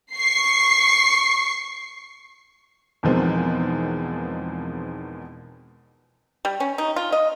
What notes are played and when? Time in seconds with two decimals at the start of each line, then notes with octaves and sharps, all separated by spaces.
0.15 C#6 C7
3.03 E2 B2 D#3 F3 G#3 C4
6.45 G3
6.60 C#4
6.78 D#4
6.96 F4
7.12 D#5